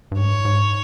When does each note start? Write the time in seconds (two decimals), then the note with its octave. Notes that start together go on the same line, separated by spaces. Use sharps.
0.12 G2
0.19 G#2 C#5
0.45 G#2